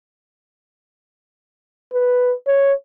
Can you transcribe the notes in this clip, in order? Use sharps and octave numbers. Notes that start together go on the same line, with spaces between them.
B4
C#5